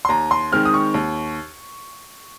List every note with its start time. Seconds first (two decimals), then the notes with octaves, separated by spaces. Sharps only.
0.05 C6
0.09 D#2 A#5
0.31 C6
0.52 D#3 G#3 C4 F6
0.65 D#6
0.74 C#6
0.94 D#2